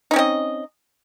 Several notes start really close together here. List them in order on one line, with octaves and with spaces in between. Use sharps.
D#4 C#4 C4 D#5